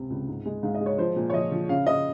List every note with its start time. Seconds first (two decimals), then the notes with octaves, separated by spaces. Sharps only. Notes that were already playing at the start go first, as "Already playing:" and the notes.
Already playing: C#2 C3
0.10 C#2
0.28 G#2
0.45 G#3
0.63 G#2 F5
0.74 D#5
0.81 G#3
0.86 C#5
0.98 F3 C5
1.16 A#2
1.30 C#5
1.34 F3 D#5
1.52 F3
1.69 C#3 F5
1.87 C#3 D#5